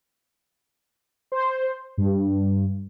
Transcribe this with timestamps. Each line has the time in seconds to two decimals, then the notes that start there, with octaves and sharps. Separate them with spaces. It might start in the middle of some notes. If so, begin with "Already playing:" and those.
1.32 C5
1.98 G2